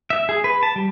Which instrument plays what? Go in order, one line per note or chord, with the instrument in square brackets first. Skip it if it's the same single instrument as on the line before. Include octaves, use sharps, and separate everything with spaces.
[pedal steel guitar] E5
G#4
B4
A5
G3